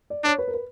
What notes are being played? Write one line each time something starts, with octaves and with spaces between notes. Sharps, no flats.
D5
D4 C#5
B4
A#4
B4